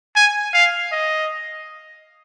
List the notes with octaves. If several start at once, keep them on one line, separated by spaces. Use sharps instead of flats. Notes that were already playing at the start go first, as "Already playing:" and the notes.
G#5
F5
D#5